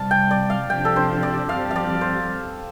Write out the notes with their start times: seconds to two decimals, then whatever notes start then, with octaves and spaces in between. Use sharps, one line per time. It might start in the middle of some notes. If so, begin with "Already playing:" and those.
Already playing: C2 C3 G3 D5 F5 A5
0.11 G5
0.31 D5
0.50 F5
0.70 C3 F3 D4 G4 G5
0.85 A4
0.96 C5
1.23 D5
1.49 G2 F3 C4 G4 F5
1.71 F5
1.76 D5
2.01 C5